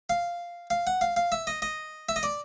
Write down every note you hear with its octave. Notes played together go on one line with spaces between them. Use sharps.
F5
F5
F#5
F5
F5
E5
D#5
D#5
E5
D#5
D5